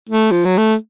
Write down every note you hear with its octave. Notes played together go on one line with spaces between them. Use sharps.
A3
F3
F#3
A3